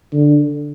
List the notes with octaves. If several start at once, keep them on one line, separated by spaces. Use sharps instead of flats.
D3